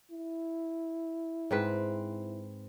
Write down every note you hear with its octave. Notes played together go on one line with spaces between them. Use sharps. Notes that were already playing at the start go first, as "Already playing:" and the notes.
E4
G#2 C4 B4